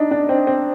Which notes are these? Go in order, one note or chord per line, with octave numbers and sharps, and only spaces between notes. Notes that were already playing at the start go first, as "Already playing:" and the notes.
Already playing: D4 D#4
D4
C4
C4